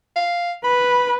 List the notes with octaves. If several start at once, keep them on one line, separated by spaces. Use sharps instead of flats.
F5
B4 B5